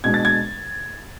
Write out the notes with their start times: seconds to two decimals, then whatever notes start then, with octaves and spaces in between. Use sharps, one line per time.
0.04 B2 G#3 D4 G#6
0.14 A6
0.25 G#6